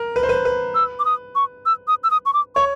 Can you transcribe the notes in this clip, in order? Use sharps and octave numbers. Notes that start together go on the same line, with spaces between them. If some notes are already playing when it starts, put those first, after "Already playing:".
Already playing: A#4
B4
C5
B4
B4
E6
D6
D#6
C#6
E6
D#6
E6
D#6
C#6
D6
C#5 C#6